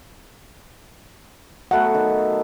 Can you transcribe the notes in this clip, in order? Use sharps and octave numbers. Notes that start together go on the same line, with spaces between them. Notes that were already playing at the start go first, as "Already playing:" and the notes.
F#3 A3 B3 F#5
D#3